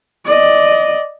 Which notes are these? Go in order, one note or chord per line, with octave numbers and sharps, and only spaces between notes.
D5 D#5